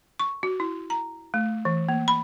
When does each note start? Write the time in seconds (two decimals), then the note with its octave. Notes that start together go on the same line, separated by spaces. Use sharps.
0.19 C#6
0.43 F#4
0.60 E4
0.90 A#5
1.34 A3
1.65 E3
1.89 A#3
2.08 B5